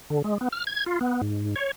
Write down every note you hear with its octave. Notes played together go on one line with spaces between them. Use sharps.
D3
G#3
B3
F6
G#6
F4
B3
G#2
C#5